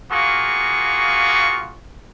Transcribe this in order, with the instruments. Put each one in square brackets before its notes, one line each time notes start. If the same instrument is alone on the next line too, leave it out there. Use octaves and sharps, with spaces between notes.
[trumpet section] A#3 F4 F#4 G#4 C#6